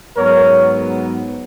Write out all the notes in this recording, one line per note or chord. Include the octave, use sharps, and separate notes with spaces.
G#2 F#3 B3 A#4 C#5